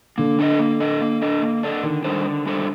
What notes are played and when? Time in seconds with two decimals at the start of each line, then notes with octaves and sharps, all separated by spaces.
0.18 D3 A#3
0.39 D4 A4 D#5
0.59 A#3
0.80 D4 A4 D#5
1.01 A#3
1.21 D4 A4 D#5
1.42 A#3
1.63 D4 A4 D#5
1.83 D3 D#3
2.05 G3 D4 A4 C5
2.26 D3
2.46 G3 D4 A4 C5